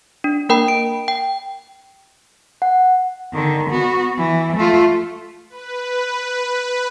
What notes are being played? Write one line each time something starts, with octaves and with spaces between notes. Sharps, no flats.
D4
A#3 A#4 G5 B5
D7
G5
F#5
D3 D#3
B3 F#4
E3
A3 F4
B4